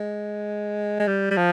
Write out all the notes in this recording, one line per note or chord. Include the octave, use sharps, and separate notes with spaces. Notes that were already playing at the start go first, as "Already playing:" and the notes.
Already playing: G#3
G#3
G3
G3
F3